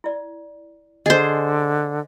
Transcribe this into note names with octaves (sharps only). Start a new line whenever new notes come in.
E4 D5
D3 G#4 C5 D#5